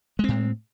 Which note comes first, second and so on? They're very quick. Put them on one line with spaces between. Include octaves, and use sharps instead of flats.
G#3 C4 A2